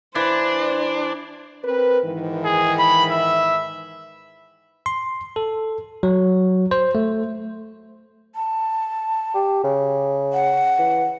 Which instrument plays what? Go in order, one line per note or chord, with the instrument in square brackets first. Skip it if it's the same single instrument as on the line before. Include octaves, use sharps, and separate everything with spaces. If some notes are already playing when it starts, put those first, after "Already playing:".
[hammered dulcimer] E3 [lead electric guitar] D4 [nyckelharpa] C5
[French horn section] C4 A#4 B4
G#2 D#3 E3
[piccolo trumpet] G#4
B5
E5
[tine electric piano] C6
A4
F#3
C5
A3
[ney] A5
[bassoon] G4
C#3
[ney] F#5
[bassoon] E3